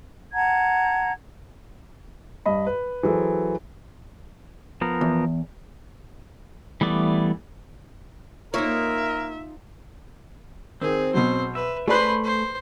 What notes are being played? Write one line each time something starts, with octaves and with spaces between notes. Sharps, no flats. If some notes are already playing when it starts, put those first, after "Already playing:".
F#5 A5 A#5 G#6
G2 D#5 B5
B4
E3 F#3 G#4 A4 C5
F3 B3 A#4
E2
E3 G3 A3 B3 D5
A#3 D#4 F4 A#4 C#5 E5
D#3 C4 G#4
B2 F#3 C5
B4 E5
A3 G#4 B4 C5 D5 B5 F#6
C5